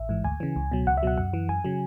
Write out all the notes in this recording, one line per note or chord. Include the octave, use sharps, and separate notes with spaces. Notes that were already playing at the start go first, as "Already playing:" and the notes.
Already playing: A1 E5
G#2 E3
D2 G#5
C#3 E3
C#2
B2 F#3
C#2 F#5
E5
B2 F#3 F#5
F#2 F#5
E3
F#2 G#5
C#3 F#3